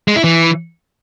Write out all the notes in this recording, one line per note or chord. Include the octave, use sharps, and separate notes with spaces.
G#3
E4
E3